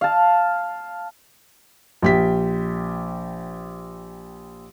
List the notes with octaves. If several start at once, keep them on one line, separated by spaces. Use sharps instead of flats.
F5 A5
A#1 G4 B6